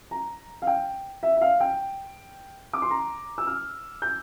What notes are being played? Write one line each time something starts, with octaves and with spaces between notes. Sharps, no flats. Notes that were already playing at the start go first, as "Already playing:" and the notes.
A#5
F5
G5
E5
E5
F5
G5
D6
C6
A#5
E6
F6
G6